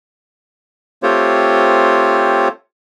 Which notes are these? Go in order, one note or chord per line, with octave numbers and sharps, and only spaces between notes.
A3 C4 F4 G4 C5 C#5